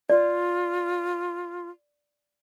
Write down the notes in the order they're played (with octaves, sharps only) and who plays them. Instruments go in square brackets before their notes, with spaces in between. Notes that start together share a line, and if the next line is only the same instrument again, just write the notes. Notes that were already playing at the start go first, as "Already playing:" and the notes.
[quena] F4 [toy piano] D5